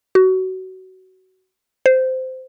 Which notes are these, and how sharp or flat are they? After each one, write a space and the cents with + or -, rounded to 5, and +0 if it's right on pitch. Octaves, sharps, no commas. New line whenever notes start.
F#4 +20
C5 -15